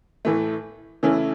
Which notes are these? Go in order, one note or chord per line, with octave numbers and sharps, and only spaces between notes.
A2 E3 A3
C#3 E3 A3 C#4 E4